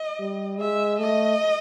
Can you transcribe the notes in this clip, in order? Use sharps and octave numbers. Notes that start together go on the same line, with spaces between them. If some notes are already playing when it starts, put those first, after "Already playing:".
Already playing: D#5
G3
G#3 E5
A3 D#5